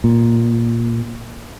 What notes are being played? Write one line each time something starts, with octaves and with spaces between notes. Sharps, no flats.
A#2